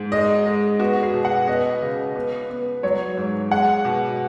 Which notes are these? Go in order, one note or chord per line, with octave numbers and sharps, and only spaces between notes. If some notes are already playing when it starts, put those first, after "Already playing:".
Already playing: G#2
G#3 D#5
G#3
B3 F#4
G#4
B2
F#5
B3 D#5
C#3
B3
B3
F#3 C#5
G#2
G#3 F#5
B2